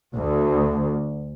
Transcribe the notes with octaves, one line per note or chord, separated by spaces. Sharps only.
D2